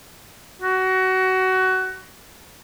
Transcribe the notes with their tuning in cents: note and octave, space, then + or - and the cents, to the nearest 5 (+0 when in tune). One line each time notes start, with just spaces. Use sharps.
F#4 +20